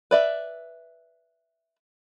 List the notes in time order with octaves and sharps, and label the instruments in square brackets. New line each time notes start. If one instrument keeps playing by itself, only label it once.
[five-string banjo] B4 D5 E5